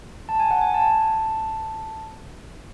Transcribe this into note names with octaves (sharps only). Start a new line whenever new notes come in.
A5
G#5
F#5
G#5
A5